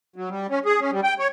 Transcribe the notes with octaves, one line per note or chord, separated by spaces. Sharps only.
F#3
G3
C#4
G#4
C#4
G3
G5
C#5